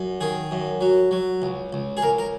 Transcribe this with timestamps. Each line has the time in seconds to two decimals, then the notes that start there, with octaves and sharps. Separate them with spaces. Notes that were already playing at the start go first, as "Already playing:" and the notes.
Already playing: F#2
0.21 D#3 G#4
0.51 F#2
0.81 F#3
1.11 F#3
1.42 C#2
1.73 C#2
1.97 G#4
2.02 C#2 A#4
2.18 A#4